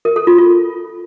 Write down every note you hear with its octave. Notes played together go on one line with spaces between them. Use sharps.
A#4
A4
F4
F4